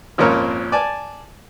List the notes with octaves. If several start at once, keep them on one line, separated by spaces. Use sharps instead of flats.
G#1 F2 A#2 C#4 A#4 C#5
D5 G#5 A5